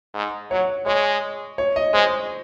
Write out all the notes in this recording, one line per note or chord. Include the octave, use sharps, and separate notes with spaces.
G#2
F#3 C#5
G#3 C#5
C#5
D#5
G#3 C5